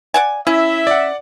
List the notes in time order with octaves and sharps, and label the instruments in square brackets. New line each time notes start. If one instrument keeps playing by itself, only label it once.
[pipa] D5 F#5 G#5
[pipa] C#4 [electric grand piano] E4 [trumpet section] E5
[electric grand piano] D5 F#5